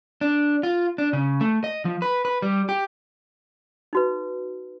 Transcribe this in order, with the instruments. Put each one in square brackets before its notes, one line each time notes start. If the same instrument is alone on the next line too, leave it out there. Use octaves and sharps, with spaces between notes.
[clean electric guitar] D4
F4
D4
C#3
A3
D#5
F3
B4
B4
G3
G4
[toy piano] D#4 F#4 B4